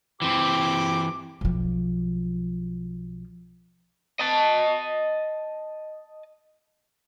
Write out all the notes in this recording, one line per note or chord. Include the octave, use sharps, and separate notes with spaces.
E3 C4 G4 D6
B1 F3
D#5 A5